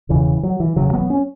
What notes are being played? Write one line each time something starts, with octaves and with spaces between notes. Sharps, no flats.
E1 E2 C#3 E3
F#3
E3
E1 E2 C#3 F#3
F#3 B3
C#4